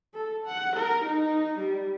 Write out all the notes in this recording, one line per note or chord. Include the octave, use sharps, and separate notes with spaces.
A4
F#5
A#4
D#4
G3